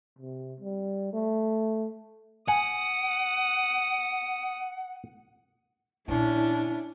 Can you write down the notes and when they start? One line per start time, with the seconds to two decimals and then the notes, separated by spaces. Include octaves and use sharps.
0.19 C3
0.60 G3
1.13 A3
2.48 F#5 G#5 D#6
6.08 A#2 C#3 C#4 D4 E4